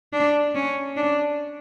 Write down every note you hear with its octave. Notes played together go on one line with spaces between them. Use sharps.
D4
C#4
D4